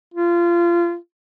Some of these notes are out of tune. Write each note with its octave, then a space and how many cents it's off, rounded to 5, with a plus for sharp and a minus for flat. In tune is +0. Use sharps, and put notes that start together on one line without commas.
F4 -25